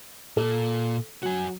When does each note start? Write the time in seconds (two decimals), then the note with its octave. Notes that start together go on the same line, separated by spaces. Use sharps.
0.37 A#2 A4
1.23 F#3 F#4 G#5